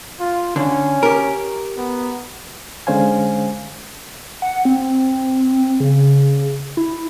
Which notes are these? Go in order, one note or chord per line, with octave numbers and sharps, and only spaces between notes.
F4
D3 C#4
G4 A#4
B3
D3 G#3 C#4 C5 F5 G#5
F#5
C4
C#3
E4